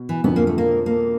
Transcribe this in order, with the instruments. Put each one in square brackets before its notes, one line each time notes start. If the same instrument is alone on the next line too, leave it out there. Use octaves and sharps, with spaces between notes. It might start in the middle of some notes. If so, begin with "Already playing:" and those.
Already playing: [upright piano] B2
[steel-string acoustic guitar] E3
[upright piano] F2 D3 F3 [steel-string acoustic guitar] B3
[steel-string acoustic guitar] A#3
A3
A#3
A#3